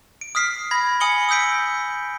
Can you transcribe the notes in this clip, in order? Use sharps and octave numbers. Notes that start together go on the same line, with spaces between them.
D7
D#6 F6 B6 C7
B5 G#6 A#6 B6
G#5 D#6 C#7 F#7 G7
D#6 E6 G6 B6 D7